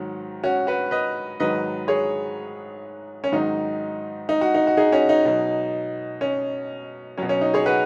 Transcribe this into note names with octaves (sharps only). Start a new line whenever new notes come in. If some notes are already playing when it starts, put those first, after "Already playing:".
Already playing: G#2 D#3 F#3
C#4 F#4
F#4 B4
B4 D#5
G#2 D#3 F#3 B4 D#5
G#4 C#5
C#4
G#2 D#3 F#3 D#4
D#4
F#4
D#4
F#4
D#4 G#4
C#4 F#4
D#4
B2 F#3
C#4
B2 F#3 C#4
C#4
D#4
G#4 C#5
F#4 B4